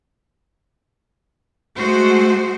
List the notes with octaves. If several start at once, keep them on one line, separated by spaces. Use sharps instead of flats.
G#3 A3 F#4 C5